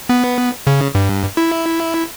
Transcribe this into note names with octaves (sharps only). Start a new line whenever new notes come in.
B3
C#3
G2
E4